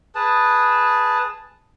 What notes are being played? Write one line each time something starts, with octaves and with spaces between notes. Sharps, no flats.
G#4 B4 A5